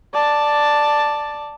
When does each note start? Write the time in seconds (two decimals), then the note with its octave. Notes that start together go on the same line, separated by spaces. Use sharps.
0.14 D5 A5